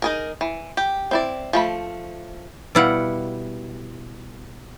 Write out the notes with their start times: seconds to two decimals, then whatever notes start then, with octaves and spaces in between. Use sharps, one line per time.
0.02 D#4 G#4 A#4
0.41 E3
0.77 G4
1.11 C4 E4 D5
1.53 F3 A3 B5
2.75 B2 G3 E4 F5 F#5